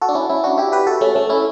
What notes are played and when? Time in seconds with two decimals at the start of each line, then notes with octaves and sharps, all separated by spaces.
0.02 F#4 A4
0.09 D4
0.15 C#4 E4
0.29 C#4 E4
0.44 D4 F#4
0.58 E4 G4
0.72 G4 B4
0.87 F#4 A4
1.01 A3 C#4
1.15 A3 C#4
1.29 C#4 E4